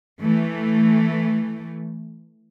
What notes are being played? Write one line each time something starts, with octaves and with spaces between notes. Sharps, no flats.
E3 A3